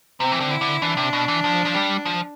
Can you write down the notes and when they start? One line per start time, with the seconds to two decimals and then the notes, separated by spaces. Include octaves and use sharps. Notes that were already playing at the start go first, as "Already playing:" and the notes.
0.20 C3 C4
0.32 E3
0.40 D3
0.50 E4
0.61 D3
0.82 E3 D4
0.97 C3
1.13 B2
1.28 E3
1.44 F3
1.65 F3
1.74 G3
2.05 F3